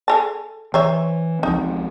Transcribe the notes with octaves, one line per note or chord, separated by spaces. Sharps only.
G#4 A4 A5
E3 C5 C#5 E5
C#2 F3 C4 D#4